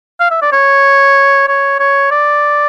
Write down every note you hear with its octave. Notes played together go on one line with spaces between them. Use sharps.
F5
E5
D5
C#5
C#5
C#5
D5